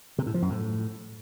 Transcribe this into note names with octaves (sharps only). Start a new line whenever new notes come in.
C3
A2
F3
F#2
A2